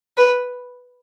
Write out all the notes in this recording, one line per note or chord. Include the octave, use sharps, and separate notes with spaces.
B4